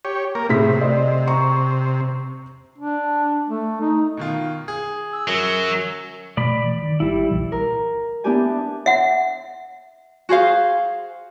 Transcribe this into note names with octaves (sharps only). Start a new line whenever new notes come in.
G4 C#5
A#3 A#4
A2 C3 G#4 B6
D5 D#5
A#5 C#6
D4
A3
D#4
B2 D#3 F4
G#4
E6
F#2 F#3
B2 A3 D5 B5
E3
D#3
G#1 G3 E4
C2 A#2 E3
A#4
B3 D4 E4 G4 G#5 A5
E5 F#5
F#4 G#4 C5 F5